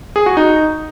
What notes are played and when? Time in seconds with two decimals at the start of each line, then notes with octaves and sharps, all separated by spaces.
0.16 G#4
0.26 F#4
0.37 D#4